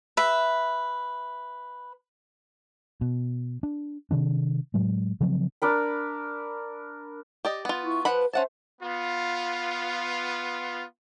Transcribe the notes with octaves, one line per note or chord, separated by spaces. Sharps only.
B4 E5
B2
D4
C3 D#3 D4
A2 F#3 G#3
C#3 F3 F#3 C4
D4 A#4 B5
G4 D5 D#5
B3 F4
E4 C#6
F3 B4 F#5 B5
C#4 C5 E5 F#5 A5
B3 F4